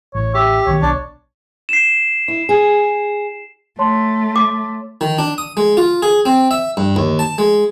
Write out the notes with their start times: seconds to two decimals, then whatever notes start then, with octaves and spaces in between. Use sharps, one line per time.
0.15 A1 C#5
0.34 G4 E5
0.67 B1 D3 D#3 C#5
0.82 B1 D4
1.69 C7 E7
2.28 E4
2.49 G#4
3.79 A3 C#5 A5 C6
4.36 D6
5.01 D#3
5.18 D4
5.38 D#6
5.57 G#3
5.77 F4
6.02 G#4
6.25 C4
6.51 E5
6.77 G2
6.96 D#2
7.19 A5
7.38 G#3